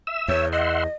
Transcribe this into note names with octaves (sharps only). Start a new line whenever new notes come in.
E5 E6
E2 C#5
D#5 E5 F#5 C6